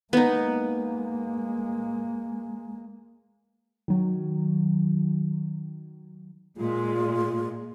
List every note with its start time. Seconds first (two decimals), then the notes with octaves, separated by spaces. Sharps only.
0.13 G#3 A#3 B3 D#4
3.88 D#3 F#3
6.57 A#2 G#3 F4